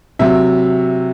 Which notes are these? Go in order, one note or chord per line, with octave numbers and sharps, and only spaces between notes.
C3 F#3 E5